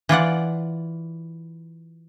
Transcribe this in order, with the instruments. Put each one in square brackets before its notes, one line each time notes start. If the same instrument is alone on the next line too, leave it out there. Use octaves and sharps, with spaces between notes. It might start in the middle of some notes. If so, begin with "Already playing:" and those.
[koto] E3 F4 D5 F#5